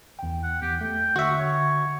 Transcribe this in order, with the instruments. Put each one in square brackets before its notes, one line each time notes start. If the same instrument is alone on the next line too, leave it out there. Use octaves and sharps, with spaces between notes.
[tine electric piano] E2 G5
[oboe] F#5
[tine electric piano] E2 [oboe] G4
[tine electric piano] A3 [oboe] G5
[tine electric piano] D3 [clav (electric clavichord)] F#4 E5 [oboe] C#6
[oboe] C#5